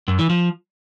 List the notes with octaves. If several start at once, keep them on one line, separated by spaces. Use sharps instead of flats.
F#2
E3
F3